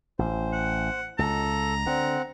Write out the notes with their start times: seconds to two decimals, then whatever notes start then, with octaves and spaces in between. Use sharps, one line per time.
0.19 A1 C5
0.53 F#5
1.19 C#2 A4 A#5
1.86 D3 C4 F#5